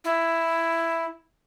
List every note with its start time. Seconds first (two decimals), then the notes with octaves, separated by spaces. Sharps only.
0.04 E4